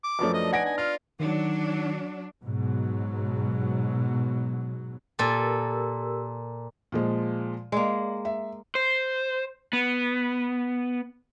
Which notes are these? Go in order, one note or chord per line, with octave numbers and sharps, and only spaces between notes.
D6
F#2 F3 A3 B3 D4
D#5
B3 D#4 F#5 G#5 A#6 D7
D4 G#5
F4 F6
D#3 F#3 D4 D#4
G#2 B2 F#3
A#2 G4 A4 A#4 E6
A#2 F3 G#3
G#3 A#3 D5
E5
C5
B3